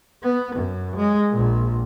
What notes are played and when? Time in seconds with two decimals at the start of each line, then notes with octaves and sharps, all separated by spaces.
0.23 B3
0.56 F#2
0.96 G#3
1.30 A#1 A#2